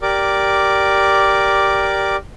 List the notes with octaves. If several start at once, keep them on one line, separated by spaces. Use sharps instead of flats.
G4 A#4 D5 D6